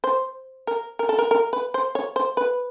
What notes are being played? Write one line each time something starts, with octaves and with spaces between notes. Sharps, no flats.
C5
A#4
A#4
A4
A#4
A#4
B4
C5
C#5
C5
B4